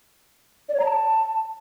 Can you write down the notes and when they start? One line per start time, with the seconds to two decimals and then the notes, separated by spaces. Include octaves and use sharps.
0.69 D5
0.74 C#5
0.80 A#5
0.85 A5